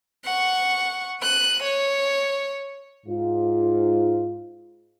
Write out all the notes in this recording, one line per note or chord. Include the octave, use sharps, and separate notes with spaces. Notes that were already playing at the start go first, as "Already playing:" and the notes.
F#5 C#6
F#6 D#7
C#5
G#2 F4